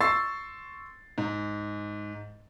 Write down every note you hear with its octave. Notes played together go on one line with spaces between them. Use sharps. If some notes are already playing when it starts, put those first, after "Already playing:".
C6 C#6 E6 A6 C7
G#2